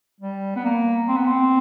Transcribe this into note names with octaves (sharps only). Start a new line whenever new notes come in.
G3
B3
A#3
C4
B3
C4